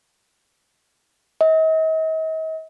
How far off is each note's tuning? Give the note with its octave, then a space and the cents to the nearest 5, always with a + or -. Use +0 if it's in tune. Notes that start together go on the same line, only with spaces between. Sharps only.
D#5 +45